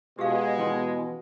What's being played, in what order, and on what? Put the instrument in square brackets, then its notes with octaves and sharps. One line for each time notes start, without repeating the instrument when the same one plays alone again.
[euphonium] B2 [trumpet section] G#3 [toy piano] G4 G#4 F5
[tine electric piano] E3 B3 [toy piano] C#4 G5 C6